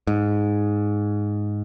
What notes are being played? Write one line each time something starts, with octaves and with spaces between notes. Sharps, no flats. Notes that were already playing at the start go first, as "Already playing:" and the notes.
G#2